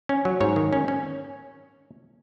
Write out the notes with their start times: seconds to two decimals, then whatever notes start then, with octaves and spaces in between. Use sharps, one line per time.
0.09 C#4
0.25 F#3
0.40 G#2 C#5
0.56 D#3
0.73 C#4
0.88 C#4